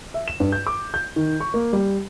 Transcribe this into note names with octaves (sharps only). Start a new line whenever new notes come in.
E5
E7
G2
G6
D6
G6
D#3
C#6
A#3
G3